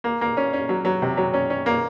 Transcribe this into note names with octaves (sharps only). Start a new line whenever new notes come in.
A#3
A#3
C#4
C#4
F#3
F#3
C3
F#3
C#4
C#4
A#3